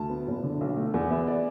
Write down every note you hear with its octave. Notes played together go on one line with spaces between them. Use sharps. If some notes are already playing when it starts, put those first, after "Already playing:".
Already playing: D2 A5
B3
F#1
D3
B1
A3
E2 F#5
B3 E5
D5